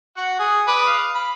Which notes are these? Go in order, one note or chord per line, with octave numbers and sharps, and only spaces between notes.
F#4 F#5
G#4
B4 D5 D#6
F5
B5